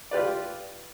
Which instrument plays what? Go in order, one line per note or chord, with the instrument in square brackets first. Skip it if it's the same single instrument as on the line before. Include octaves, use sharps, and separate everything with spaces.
[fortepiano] F4 G4 B4 D5